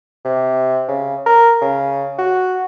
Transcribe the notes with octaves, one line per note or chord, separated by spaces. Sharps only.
C3
C#3
A#4
C#3
F#4